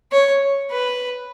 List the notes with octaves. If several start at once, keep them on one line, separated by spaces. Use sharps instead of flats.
C#5
B4